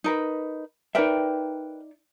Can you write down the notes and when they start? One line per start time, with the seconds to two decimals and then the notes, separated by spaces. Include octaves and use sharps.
0.04 D#4 A#4 B4
0.95 D#4 A#4 B4 D5 E5 G5